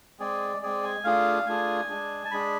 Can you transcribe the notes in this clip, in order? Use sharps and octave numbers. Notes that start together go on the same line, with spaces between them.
G#3 C4 G#4 D5
G#3 C4 G#4 D5
G#5
A3 D4 F4 G#4 F5
A3 D4 F4 G#4 G#5
G#3 D4 G#4
A5
G#3 D4 G#4 B5